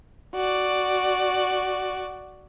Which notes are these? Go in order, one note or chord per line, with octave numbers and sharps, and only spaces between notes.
F#4 D5